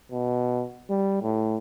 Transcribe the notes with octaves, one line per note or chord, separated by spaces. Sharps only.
B2
G3
A2